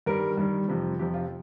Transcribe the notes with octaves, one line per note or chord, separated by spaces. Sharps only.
G2 D#3 G3 A#4
G2 D#3 G3
F2 C3 F3
F2 C3 F3 G4
F4